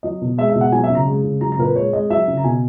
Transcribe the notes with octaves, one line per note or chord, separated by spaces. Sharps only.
F#3 D#5
B2
G#3 E5
E5
B2
F#5
F#3 G#5
E5
C#3
A#5
G#3
C#3
F#3 A#5
A#5
A#2 A#4
B4
G#3 C#5
G#3 D#5
F#3 E5
C#3
A#5
B2 G#5